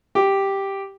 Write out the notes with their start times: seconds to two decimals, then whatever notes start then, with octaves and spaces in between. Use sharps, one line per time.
0.15 G4